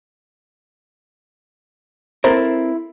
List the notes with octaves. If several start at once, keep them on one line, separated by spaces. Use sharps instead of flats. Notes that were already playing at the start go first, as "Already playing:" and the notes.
C4 E4 A4 A#4 C5 A#5 A6